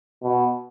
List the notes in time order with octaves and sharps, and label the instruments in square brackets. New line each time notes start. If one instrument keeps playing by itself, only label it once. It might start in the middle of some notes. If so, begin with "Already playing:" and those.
[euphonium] B2